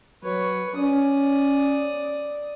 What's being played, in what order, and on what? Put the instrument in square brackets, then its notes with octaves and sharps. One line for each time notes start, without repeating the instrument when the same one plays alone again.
[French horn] F#3 [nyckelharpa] B4 C#5
[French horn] C#4 [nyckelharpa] D5 D#6